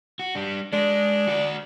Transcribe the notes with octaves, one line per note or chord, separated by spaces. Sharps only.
F#4
G3 D4
G#3 D4
F#4 D5